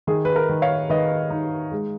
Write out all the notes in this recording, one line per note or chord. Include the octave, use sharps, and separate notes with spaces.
D#3 G#4
B4
A#4
D#3
C#5 F5
D#3 B4 D#5
D#4
G#3